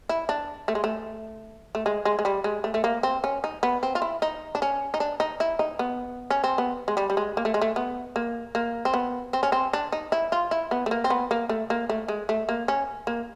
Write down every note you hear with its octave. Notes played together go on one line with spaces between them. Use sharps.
E4
D4
A3
G#3
A3
A3
G#3
G#3
G#3
G3
G#3
A3
A3
A#3
C4
C#4
D#4
B3
C4
F4
E4
D#4
D4
C#4
D#4
D4
D#4
E4
D#4
B3
C#4
C4
B3
G#3
G3
G3
G#3
A#3
A3
G#3
A3
B3
A#3
A#3
C4
B3
C4
C#4
C4
D4
D#4
E4
F4
E4
B3
A3
A#3
C4
B3
A#3
A3
A#3
A3
G#3
A3
A#3
C#4
A#3